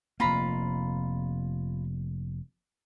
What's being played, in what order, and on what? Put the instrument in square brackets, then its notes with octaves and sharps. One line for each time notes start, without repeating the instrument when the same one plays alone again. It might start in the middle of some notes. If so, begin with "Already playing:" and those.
[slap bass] F1 A#3 [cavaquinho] F4 A#5 B5